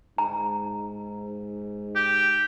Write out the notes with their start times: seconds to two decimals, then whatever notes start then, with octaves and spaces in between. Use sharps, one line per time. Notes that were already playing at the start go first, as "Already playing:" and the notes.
0.18 G#2 A#5
1.95 G4